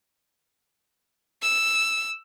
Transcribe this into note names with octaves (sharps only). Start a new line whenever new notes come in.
E6